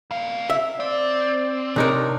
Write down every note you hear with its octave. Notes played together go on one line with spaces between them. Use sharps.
C3 F5
E5
C4 D5
C3 D4 D#4 A#4 C#5